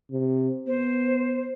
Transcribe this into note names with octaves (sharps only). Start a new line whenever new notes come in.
C3
B3 C5